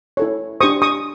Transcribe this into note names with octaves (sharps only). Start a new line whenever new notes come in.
E4 A4 C#5
D4 G4 C5 C#6 D#6
C#6 D#6